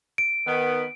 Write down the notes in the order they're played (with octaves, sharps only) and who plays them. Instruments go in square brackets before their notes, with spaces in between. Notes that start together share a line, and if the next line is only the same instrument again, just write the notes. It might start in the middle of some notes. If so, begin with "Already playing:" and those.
[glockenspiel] D7
[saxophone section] D#3 B3